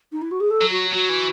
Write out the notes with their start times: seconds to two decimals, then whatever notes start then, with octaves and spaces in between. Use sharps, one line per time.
0.12 D#4
0.21 E4
0.31 F#4
0.40 G#4
0.50 A4
0.61 F#3
0.71 F#4
0.93 F#3 F#4
1.09 E3